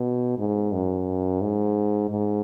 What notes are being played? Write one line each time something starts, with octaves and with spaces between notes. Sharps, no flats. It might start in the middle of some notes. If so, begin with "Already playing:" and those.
Already playing: B2
G#2
F#2
G#2
G#2